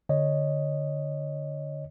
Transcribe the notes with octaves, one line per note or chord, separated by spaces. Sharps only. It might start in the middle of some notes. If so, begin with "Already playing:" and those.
D3 C#5 D#5